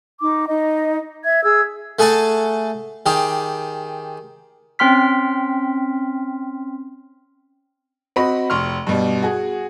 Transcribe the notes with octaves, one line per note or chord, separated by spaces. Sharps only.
D#4 D6
D#4 D#5
E5 G#6
G#4 E6 G#6
A3 G#4 F#5 G#5 A5
D#3 G4 G#4
C4 C#4 G5 C6 F6 B6
C4 F#4 D#5 B5
F1 C6 C#6 F6
G2 B2 G3
F#4 G#4